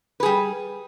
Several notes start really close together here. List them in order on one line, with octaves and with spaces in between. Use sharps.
B4 G#4 G3